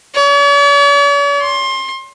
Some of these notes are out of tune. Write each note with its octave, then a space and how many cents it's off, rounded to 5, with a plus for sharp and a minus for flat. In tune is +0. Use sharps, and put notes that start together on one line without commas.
C#5 +45
C6 +25